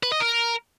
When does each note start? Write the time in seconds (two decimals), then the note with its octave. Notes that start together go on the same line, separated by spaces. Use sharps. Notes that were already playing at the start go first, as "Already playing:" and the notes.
0.03 B4
0.12 D#5
0.20 A#4